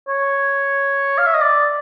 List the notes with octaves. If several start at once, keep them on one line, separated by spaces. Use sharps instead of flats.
C#5
F5
E5
D#5
D5